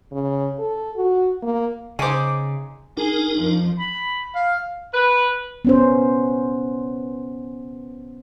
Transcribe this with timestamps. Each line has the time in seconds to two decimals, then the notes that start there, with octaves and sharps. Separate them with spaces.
0.12 C#3
0.59 A4
0.97 F#4
1.43 A#3
1.99 C#3 G#3 D#4 C5 G#5 D6
2.97 D4 D#4 G#4 A#4
3.37 F2 F3
3.79 B5
4.35 F5
4.94 B4
5.65 B3 C#4 C5